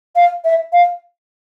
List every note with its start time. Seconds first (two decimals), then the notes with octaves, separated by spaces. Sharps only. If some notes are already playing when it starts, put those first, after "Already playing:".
0.16 F5
0.44 E5
0.73 F5